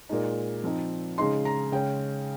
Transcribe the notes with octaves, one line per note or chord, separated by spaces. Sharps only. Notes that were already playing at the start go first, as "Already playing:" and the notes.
A#2 G#3 D#4
F3 C4 D#4
C#3 G#3 D#4 C6
A#5
C#3 G#3 C#4 G5